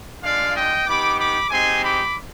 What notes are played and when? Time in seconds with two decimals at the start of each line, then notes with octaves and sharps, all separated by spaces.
0.23 G#3 D4 F4 D5 F5
0.55 D#5 G5
0.87 B3 D#4 G4 B5 D6
1.18 B5 D6
1.50 G#3 C4 D#4 G4 G#5 C6
1.83 B5 D6